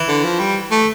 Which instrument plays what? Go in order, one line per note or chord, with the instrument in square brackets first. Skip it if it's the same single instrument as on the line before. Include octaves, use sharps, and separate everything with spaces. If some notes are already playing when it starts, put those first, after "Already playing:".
Already playing: [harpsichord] E3
[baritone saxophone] D3
F3
G3
A3